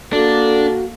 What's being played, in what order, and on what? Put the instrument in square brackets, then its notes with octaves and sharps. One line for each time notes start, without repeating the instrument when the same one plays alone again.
[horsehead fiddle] A#3 [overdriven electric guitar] D4 [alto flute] F#4 [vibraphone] A4